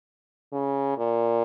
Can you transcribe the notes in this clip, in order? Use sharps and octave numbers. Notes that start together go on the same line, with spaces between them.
C#3
A#2